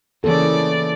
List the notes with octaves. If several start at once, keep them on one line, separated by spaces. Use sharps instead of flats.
C#3 E3 A#3 A4 D5